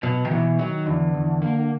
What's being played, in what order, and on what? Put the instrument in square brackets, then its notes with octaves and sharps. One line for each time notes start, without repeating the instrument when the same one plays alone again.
[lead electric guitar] B2 [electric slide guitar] F#3
[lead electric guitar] D#3
[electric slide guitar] B2 [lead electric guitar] E3
[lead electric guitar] D#3 [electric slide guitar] F#3
[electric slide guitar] E2 [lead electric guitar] D3
[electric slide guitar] E2
A#3